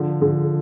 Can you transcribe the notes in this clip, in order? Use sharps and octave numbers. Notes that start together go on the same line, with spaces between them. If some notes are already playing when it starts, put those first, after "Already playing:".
Already playing: D3 F3
D3